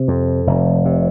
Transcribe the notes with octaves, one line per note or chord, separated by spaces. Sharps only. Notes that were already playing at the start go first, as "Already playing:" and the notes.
Already playing: C3
F2
F1
C3